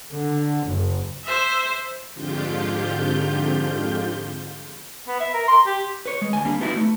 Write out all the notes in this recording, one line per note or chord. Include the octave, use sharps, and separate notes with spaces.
D3
F#1
C5 E5
F2 G#2 D3 F4 G4 G6
B3
E5
A#4
C6
G4
B4 C#5
G#3
D2 G#5
G3 A#3 D4
B3 D#4 E4 F#4
A3